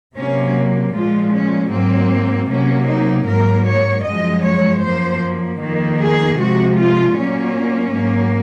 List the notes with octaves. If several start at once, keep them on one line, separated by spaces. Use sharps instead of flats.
C3 F#3 A#3 C#4
A#2 F3 G#3 F4
C#4
G#2 F#3 A#3 C4
C3 F#3 A#3 C#4
D#4
G#2 F#3 A#3 A#4
C#5
F#2 F3 G#3 D#5
C#5
F#2 F3 A#3 C5
F2 D#3 A#3
G#4
C3 F3 G#3 F#4
F4
A#2 F#3 A#3 C#4
G#2 F#3 A#3